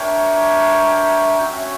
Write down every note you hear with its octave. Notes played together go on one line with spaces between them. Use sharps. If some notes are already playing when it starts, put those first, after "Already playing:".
Already playing: D4 A#4 C#5 E5 G5
C#4 F#4 C#5 E5